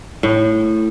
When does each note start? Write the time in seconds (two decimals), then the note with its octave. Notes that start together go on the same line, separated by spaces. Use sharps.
0.23 A2